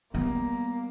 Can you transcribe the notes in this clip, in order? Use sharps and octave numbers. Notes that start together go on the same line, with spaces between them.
G3 A#3 B3